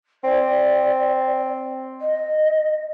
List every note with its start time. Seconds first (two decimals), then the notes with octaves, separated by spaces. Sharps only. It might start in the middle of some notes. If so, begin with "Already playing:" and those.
0.24 C4 D5
2.00 D#5